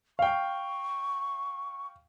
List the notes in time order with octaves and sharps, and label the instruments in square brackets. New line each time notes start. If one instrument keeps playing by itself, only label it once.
[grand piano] F5 G5 [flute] C#6